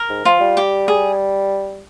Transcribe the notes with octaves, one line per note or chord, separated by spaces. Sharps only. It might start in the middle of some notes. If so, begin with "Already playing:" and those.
Already playing: A#4
G#2
F3 F4
G3
G4
G#4